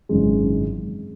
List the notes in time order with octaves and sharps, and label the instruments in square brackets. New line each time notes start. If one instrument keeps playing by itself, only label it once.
[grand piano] G#1 F#2 C#3 E3 G#3